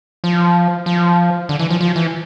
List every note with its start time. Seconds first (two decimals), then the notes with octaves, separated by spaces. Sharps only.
0.24 F3
0.86 F3
1.49 D3
1.59 E3
1.70 F3
1.81 F3
1.96 E3